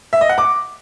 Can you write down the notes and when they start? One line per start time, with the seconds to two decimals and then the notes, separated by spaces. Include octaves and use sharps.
0.13 E5
0.21 D#5
0.29 F#5
0.38 D6